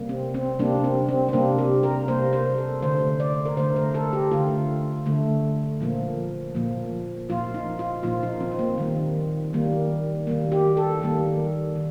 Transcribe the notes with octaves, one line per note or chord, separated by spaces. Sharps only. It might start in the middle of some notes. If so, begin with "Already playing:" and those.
Already playing: C3 G3 A#3
C4
C4
C3 G3 A#3 D4
C4
C4
C4
C3 G3 A#3 D4
G4
A#4
C3 G3 A#3 C5
C5
A4
D3 A3 C5
D5
A#4
D3 A3 C5
A#4
A4
G4
D3 A3 F4
D3 A3
A#2 F3 A#3
A#2 F3 A#3
A#2 F3 A#3 F4
D#4
F4
A#2 F3 A#3 F4
D#4
C4
C4
A#3
D#3 G3 A#3
D#3 G3 A#3
D#3 G3 A#3
G4
A4
D#3 G3 A#3
D#3